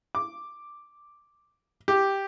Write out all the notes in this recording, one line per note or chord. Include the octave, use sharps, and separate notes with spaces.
D6
G4